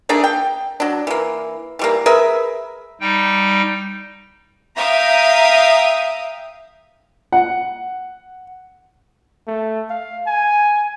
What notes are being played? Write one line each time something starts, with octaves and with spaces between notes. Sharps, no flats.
A3 A#3 D4 G#4
G5
F#3 D4
E3 A#3
E3 G3 A#3
G#4 A#4 B4 E5
G3 D#4 G5
E5 F5 G5 A#5 D#6
F#5
A3
F5
G#5